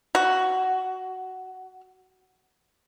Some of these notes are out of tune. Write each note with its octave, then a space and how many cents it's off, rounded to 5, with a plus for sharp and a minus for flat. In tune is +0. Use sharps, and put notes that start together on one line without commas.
F#4 +10